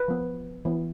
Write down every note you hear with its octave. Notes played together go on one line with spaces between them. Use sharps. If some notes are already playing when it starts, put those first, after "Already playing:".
Already playing: B4
F3 B3
E3 B3